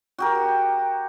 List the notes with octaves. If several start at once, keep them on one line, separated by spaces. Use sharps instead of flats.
F#4 G4 A#4